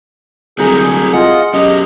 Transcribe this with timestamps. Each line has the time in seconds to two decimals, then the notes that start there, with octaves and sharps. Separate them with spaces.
0.59 C2 D3 F#3 A3 G#4 A#5 G6
0.86 C2
1.13 F4 G#4 D#5 F#5
1.54 F#2 B2 G4 D#5